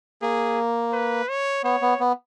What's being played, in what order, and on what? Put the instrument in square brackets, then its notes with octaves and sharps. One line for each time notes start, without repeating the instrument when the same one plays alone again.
[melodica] A#3 [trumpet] G#4
[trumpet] B4
C#5
[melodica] B3 [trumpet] C#5
[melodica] B3
B3